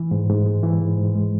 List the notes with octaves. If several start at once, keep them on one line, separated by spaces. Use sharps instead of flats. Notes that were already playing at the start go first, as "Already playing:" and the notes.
Already playing: E3
G#2
G#2
G#3
E3
G#2
G#2
G#3